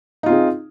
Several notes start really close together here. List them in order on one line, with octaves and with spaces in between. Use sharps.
D#4 F4 C4 G#4